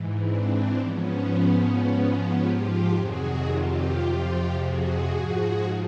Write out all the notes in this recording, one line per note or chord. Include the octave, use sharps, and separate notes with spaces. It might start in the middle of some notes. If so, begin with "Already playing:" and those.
Already playing: G#2 E3
C4 D4
G#2 F3 B3 C#4
G#2 F3
F4 G4
F2 C3 D#3 F#3 F#4 G#4
F4 G4
F2 C3 F3
F#4 G#4
G#2 F3